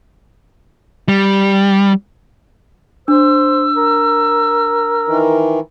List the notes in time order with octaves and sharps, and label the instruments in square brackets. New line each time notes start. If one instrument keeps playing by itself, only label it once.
[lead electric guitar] G3
[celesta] D4 [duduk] C5 [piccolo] E6
[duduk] A#4
[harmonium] D#3 E3